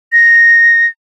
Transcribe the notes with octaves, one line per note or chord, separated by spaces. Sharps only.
A#6